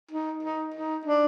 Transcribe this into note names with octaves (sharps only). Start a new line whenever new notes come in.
D#4
D#4
D#4
D4